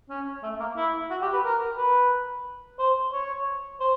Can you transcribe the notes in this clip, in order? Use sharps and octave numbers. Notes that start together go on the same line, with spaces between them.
C#4
A3
A#3
E4
F#4
G4
B4
A#4
B4
C5
C#5
C5